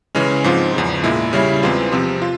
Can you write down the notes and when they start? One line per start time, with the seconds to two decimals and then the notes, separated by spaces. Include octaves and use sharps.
0.15 C#3 E3 G#3 C#4
0.44 G#2 F3 C4 F4
0.74 E2 C#3 F3
1.04 A#2 G#3 E4
1.33 C#3 G3 C#4 E4
1.63 E2 E3 G#3 C4 F4
1.92 C3 F3 C4
2.22 F4